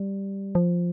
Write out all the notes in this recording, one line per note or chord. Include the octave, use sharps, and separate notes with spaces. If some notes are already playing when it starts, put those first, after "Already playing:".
Already playing: G3
F3